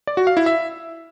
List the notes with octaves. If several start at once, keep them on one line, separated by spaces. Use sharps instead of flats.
D5
F#4
F5
E4
E5